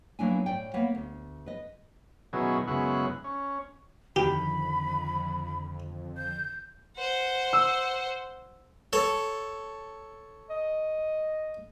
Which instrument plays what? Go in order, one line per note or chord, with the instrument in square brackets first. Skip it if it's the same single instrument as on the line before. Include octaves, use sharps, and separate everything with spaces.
[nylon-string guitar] F#3 A#3 B3 D4 E4 G#5
A2 D5 G5
A#3 B3 B4 C#5 F#5
D2
B4 D#5
[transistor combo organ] B2 D#3 F#3 C#4 E4 G#4
F#2 C#3 G#3 B3 E4 F#5
C#4
[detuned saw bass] F2 [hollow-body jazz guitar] D3 D#3 [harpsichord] G4 [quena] B5
[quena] G6
[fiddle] C5 F#5
[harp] E6
[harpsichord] A4 C#5
[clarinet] D#5